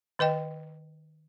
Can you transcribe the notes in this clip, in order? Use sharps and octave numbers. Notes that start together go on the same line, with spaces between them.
D#3 B4 D#5 G5